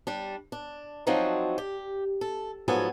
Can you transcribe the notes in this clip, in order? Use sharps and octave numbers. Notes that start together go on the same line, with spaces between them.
G3 D4
D4
F3 F#3 C4 D4 D#4 F#4
G4
A4
G#2 F3 F#3 B3 A4 G#5